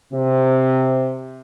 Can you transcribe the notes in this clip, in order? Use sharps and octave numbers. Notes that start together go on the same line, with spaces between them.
C3